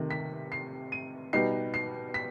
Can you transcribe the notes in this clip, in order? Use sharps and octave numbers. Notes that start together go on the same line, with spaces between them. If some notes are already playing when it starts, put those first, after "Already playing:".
Already playing: C3 D#3 A3 D#4
B6
C7
D#7
B2 G3 B3 D#4 C7
C7
B6